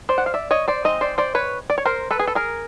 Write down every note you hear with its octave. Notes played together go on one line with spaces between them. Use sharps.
C5 D5
F#5
F5
D5 E5
C#5 D#5
C5 D5
G#3 C4 D#4 D#5
C5 D5
C5 D5
B4 C#5
D5
C#5
A#4 C5
A4 B4
G#4
A4
G#4 A#4